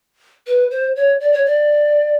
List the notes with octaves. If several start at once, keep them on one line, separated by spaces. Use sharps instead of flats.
B4
C5
C#5
D5
C#5
D5